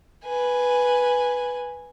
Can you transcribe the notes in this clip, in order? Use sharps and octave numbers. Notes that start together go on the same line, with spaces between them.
B4 G#5